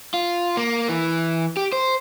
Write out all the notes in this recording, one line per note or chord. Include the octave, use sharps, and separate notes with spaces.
F4
A#3
E3
G4
C5